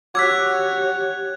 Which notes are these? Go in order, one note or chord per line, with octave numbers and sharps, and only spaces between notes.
F#4 G4 C#5 D6 E6 F#6 G#6 B6